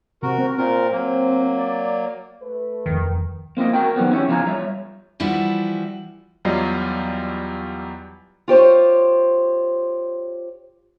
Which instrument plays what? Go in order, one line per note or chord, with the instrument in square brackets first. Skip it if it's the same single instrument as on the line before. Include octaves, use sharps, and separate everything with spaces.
[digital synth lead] C3 [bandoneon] F#4 A#4
[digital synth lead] C4
[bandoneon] A#2 A#4 [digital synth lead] C4
[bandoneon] F#3 A#3
[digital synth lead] D5
[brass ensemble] A3 B4
[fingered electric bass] D#1 F2 [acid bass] D#3
[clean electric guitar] A#3 C4 F4 D#5
F#4 A#4 G5
D#3 F#3 G3 B3 C4
C#4 E4 G4 C#5
C#3 F3 F4 G#4 G#5 A#5
G3 F4 C#5 E5
[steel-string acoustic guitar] E3 F3 G3 E4 F#4
[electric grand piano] E2 F#3 G3 F4 D#5 C7
[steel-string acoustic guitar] F4 G4 C5 C#5